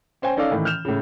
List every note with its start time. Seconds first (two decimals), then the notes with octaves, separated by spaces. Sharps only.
0.22 C#4 C5 G5 G#5
0.37 C#4 D#4 A4 D5 F5
0.51 A2 D#3 E3
0.65 F6 G6 E7 F7
0.85 A2 C#3